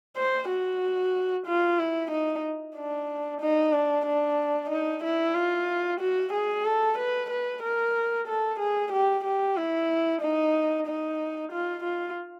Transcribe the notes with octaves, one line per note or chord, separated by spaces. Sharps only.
C5
F#4
F4
E4
D#4
D4
D#4
D4
D4
D#4
E4
F4
F#4
G#4
A4
B4
B4
A#4
A4
G#4
G4
G4
E4
D#4
D#4
F4
F4